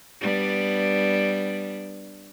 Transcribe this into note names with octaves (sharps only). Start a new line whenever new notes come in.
G3 B3 D4